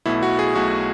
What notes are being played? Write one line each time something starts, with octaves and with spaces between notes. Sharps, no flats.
B1 B2 A3 E4
F#4
G#4
B1 B2 A3 F#4